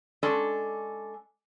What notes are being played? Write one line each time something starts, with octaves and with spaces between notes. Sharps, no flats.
G#3 C#4 D4 A4 D5